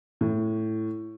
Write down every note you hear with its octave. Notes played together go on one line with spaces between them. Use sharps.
A2